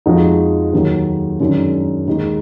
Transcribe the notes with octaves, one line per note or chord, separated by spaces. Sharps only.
F2 F3 G#3 D#4 F#4
D#2 D#3 F#3
F#2 D#3 G#3 D4
D#2 D#3 G#3 D#4